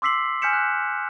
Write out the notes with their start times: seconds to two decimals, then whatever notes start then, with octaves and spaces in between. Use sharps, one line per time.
0.02 C6 D6 E6 B6 C7 F#7
0.42 G#5 F6 G6 B6 C#7 E7
0.53 F#6